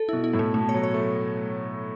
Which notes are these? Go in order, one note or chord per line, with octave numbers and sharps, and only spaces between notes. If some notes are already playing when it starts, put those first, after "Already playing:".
Already playing: A4
B2 E4
E4
A2
A3
B2 A3
C#5
F#3
C#5
A3